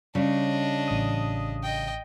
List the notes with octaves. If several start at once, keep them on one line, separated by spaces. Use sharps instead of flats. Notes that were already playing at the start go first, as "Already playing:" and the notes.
C#3 G3 D4 C#5 D#5
A1 D#6
D#5 G5